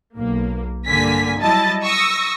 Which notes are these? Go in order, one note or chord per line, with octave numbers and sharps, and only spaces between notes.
B1 A#3
G2 D3 A#3 G#5 B6
F#3 G3 E4 D#5 A5 A6
C#6 D#6 E6 A#6 C#7